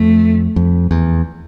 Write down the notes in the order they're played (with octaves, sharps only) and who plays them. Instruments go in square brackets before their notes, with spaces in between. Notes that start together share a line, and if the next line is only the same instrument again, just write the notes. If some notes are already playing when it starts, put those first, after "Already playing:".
Already playing: [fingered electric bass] F2 [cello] A3
[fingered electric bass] F2
E2